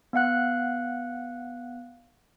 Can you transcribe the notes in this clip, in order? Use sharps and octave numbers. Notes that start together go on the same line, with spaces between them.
B3 F5 F#5 F#6